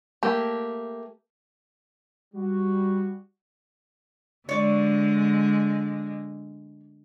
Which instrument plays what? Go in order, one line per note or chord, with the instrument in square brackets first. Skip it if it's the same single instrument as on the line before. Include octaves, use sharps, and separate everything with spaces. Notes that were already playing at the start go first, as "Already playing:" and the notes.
[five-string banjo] A3 A#3 G4
[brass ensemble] G3 F#4
[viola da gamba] D3 G#3 [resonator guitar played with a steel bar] C#5 D5